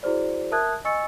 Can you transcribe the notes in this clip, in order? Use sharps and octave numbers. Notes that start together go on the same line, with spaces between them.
E4 F#4 G#4 C5 D5
A#4 E5 A5 D#6 F#6 G#6
D#5 G#5 C#6 E6 A6 C#7